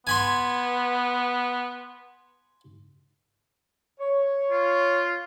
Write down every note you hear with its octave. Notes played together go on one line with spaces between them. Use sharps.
B3 G#5 B5 C6
C#5
F4